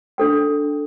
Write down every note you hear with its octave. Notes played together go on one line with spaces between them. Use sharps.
D4 A4 G5